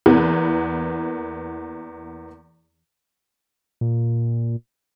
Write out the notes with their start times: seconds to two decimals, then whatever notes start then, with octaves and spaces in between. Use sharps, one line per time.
0.06 E2 E3 A#3 B3
3.81 A#2